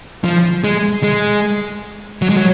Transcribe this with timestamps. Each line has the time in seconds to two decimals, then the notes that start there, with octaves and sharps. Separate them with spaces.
0.24 F3
0.64 G#3
1.03 G#3
2.22 F#3
2.29 G#3
2.37 F#3